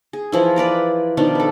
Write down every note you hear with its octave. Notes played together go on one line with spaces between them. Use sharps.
G#4
E3 F3 E4
A#4 B4 D5 A#5
B2 D#3 F3 D4
A4 B4